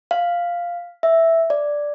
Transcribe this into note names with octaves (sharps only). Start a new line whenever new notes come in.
F5
E5
D5